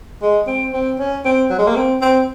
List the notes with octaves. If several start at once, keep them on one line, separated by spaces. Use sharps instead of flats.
G#3
C4
C4
C#4
C4
F#3
G#3
A#3
C4
C4